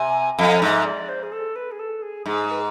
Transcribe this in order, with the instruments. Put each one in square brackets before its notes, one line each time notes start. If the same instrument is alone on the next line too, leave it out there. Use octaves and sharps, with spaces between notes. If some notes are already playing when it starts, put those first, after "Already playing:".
Already playing: [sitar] C3 [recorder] G#5
[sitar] F2 [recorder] F5
[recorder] D5
[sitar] G#2 [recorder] E5
[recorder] D5
C5
G#4
A4
B4
G#4
A4
G#4
[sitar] G#2 [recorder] G#4
[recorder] B4